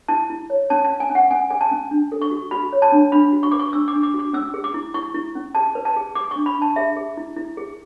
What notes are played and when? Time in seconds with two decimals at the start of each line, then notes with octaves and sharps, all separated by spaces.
0.08 E4 A5
0.30 E4
0.50 C#5
0.70 C#4 A5
0.85 A5
0.90 C#4
1.00 G#5
1.10 C#4
1.15 F#5
1.31 C#4 G#5
1.50 G#4 G#5
1.61 A5
1.71 C#4
1.91 D4
2.12 A4
2.22 C#6
2.31 F#4
2.51 F#4 B5
2.73 C#5
2.82 A5
2.92 D4
3.12 D4 B5
3.33 F#4
3.43 C#6
3.52 B4 D6
3.59 C#6
3.73 D4 E6
3.88 D6
3.93 D4
4.03 D6
4.14 F#4
4.19 D6
4.33 C#4 E6
4.54 G#4
4.64 D6
4.74 E4
4.94 E4 C#6
5.14 E4
5.35 C#4
5.55 G#4 A5
5.75 B4
5.85 A5
5.96 G#4
6.15 G#4 D6
6.31 D4 C#6
6.46 B5
6.56 D4
6.62 A5
6.76 G#4 E5
6.96 G#4
7.17 E4
7.37 E4
7.57 G#4